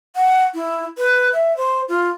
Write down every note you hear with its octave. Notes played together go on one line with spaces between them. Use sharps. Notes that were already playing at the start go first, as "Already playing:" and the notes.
F#5
E4
B4
E5
C5
F4